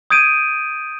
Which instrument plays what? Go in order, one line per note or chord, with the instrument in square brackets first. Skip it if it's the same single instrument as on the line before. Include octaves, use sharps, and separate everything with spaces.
[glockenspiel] D#6 G6 G#6 D7 D#7